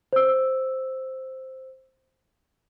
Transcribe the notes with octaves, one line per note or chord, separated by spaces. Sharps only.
C5 E6